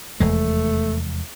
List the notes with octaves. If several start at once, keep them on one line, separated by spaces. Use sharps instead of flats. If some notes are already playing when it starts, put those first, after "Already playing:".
F1 E2 G#3 A3